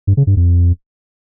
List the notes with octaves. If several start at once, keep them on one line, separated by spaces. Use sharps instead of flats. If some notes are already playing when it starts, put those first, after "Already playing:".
G2
C#3
G2
F2